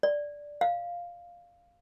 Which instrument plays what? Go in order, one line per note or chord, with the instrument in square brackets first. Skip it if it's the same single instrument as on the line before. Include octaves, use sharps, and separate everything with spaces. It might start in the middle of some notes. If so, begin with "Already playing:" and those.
[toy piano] D5
F5